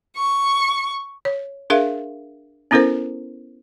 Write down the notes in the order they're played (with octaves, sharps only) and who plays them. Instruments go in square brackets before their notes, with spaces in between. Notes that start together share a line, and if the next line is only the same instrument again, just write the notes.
[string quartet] C#6
[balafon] C#5
D4 G#4 A#4 E5 F5
B3 C#4 E4 A4 A#4 C5